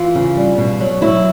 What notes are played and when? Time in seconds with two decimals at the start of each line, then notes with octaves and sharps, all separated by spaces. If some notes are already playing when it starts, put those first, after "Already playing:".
Already playing: E3 F4
0.15 C#3
0.37 G3
0.58 B2
0.80 F#3
1.02 F#3 E4